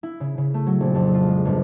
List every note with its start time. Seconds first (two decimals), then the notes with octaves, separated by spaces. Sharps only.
0.03 E4
0.20 C#3
0.38 C#3
0.54 A3
0.67 F#3
0.81 A#1
0.94 F2
1.14 F4
1.28 G#3
1.45 G1